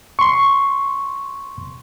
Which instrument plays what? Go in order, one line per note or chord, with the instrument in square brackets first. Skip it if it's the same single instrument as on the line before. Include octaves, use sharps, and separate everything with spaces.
[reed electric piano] C6 C#6